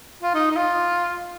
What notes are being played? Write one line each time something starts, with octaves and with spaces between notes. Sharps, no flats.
F4
D#4
D#4
F4